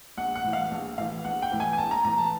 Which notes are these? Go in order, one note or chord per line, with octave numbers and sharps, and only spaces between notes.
A#1 F#5
F#5
A2 E3
F5
A#1
A2 E3 F5
A#1 F#5
G5
A2 E3
G#5
G#5
A#1 A5
A#5
A2 E3 A#5
A5